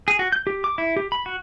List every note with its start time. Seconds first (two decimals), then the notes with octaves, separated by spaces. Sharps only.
0.08 G#4
0.19 F#4
0.32 G6
0.47 G4
0.64 D6
0.78 E4
0.97 G4
1.12 B5
1.26 F#4